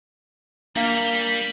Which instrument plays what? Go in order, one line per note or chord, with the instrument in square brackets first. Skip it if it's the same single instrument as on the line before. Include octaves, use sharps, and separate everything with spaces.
[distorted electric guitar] G3 [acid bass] A#3 [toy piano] D4 F5 [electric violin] A#5 B6